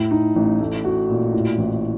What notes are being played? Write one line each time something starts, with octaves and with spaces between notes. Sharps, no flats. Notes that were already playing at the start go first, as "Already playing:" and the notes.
Already playing: A2
D#4
A1
A3
F#4
A#2
A2
A1